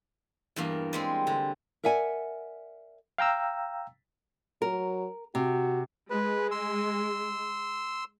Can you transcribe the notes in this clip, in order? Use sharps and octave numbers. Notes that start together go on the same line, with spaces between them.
E2 G2 A#3
G3 G#3 C4
D3
A#4 D5 E5 F#5 G#5
F5 G5 A#5 E6
F#3 A#4
C3 F#4
G#3 B4
C6 E6